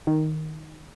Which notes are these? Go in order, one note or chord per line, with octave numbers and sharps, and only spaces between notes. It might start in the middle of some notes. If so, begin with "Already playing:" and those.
D#3